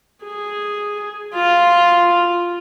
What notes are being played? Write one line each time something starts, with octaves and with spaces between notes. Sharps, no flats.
G#4
F4